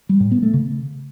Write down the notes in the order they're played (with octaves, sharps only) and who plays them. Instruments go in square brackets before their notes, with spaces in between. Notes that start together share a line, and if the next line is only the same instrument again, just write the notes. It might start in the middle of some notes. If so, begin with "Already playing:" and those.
[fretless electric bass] G3
A2
B3
A3
C#3